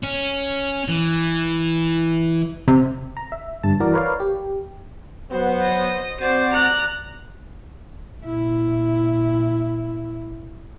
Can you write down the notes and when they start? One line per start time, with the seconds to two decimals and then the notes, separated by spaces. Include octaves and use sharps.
0.04 C#4
0.88 E3
2.68 C3
3.17 A#5
3.32 E5
3.63 G1 G2 A5
3.80 E3 F#4 A#4 D5
3.94 A#4 B4 C#5 D5 F5
4.20 G4
5.31 F#3 B3 F#4 C5
5.61 D#5
6.21 C4 F#4 C5 D5
6.53 A#5 F#6
8.21 A#2 E4